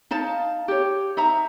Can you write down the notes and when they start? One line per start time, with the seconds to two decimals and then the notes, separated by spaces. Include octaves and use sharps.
0.11 D#4 F5 A5
0.68 G4 C#5
1.17 D#4 E5 A#5